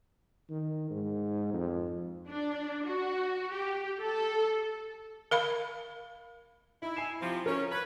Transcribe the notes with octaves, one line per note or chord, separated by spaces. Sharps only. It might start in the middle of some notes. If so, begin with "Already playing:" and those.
D#3
G#2
F2
D4
F#4
G4
A4
A#4 F5 B5
D#4 E4
G#5 C7 E7
C3 F3
C#4 A#4
B4 G#6